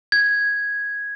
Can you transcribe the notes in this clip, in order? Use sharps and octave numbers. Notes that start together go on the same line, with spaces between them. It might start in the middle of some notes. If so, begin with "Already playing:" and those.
G#6